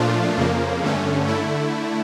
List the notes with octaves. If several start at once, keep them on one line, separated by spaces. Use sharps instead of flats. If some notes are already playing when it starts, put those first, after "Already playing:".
Already playing: A#2 F3 A3 D4 F4
F2 C#3 F3 A#3
G2 D3 A3 C#4
D3 A3 E4